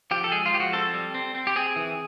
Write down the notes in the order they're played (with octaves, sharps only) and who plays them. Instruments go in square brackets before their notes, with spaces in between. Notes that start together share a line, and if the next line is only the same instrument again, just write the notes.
[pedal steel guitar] F3 G4
A4
G#3 G#4
F4
F3 G4
F#4
C4 A4
G3
C4
C4
G4
C4 G#4
E3